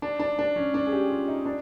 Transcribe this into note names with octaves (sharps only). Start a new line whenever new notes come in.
D4
D4
D4
C#4
D4
G#4
G4
F4
D#4
D4